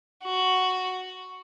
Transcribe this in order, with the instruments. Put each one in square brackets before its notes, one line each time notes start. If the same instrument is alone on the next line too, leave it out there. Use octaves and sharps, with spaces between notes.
[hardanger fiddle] F#4